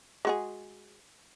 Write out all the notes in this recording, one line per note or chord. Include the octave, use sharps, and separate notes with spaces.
G#3 F#4 G#4